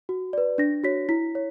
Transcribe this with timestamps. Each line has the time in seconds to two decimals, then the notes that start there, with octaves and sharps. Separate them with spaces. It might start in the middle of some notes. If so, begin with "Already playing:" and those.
0.09 F#4
0.33 B4 D5
0.58 D4 A#6
0.83 F#4 C#5 B6
1.09 E4 B6
1.35 C#5